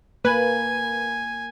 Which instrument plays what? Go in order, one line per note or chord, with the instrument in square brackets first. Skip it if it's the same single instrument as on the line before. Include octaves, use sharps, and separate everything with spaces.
[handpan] A#3 [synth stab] B4 [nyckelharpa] G#5